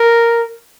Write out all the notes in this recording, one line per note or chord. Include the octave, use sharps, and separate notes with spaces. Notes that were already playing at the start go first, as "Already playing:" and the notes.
Already playing: A#4